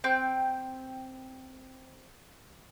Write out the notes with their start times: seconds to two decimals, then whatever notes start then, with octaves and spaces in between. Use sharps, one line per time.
0.04 C4 G5